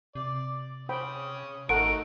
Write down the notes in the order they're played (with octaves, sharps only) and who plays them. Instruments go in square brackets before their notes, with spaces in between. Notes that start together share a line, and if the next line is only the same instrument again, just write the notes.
[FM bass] C3 [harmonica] D5
[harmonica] C#4 D#6 [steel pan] C5 G5 B5
[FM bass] G#1 [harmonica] A3 D#4 F#4 [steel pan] A4 A#4 F#5 [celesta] D7